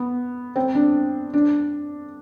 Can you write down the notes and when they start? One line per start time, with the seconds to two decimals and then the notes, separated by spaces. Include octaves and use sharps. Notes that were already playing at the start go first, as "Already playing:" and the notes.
Already playing: B3
0.56 C4
0.75 D4
1.33 D4